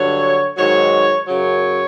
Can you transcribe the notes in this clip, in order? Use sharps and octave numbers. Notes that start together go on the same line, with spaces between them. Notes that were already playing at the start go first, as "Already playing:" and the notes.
Already playing: G2 D3 F#3 C#5
G#2 D#3 F#3 C#5
F#2 C#3 F#3 C#5